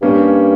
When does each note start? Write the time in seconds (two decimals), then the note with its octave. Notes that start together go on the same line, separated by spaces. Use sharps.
0.02 G2 A#3 C#4